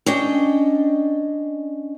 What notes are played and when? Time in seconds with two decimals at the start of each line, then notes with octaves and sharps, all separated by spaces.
0.06 C#4 D4 D#5 G5